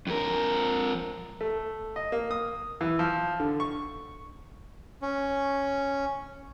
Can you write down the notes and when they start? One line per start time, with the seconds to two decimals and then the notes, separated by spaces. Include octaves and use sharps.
0.07 F2 A#4
1.41 A3
1.96 D#5
2.12 A#3
2.31 D#6
2.81 E3
2.99 F3
3.40 D3
3.60 C#6
5.02 C#4